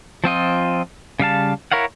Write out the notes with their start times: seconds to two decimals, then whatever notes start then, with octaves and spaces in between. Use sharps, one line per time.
0.24 F3 C4 F4 D#5
1.20 C#3 G3 F5 A5
1.72 E4 A#4 C#5 F5 F#5